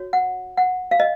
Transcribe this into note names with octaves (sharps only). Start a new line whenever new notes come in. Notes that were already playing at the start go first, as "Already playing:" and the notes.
Already playing: F#4 C#5
F#5
F#5
F5
D#5